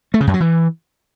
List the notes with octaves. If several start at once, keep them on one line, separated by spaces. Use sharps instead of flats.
A3
C#3
F#2
F#3
E3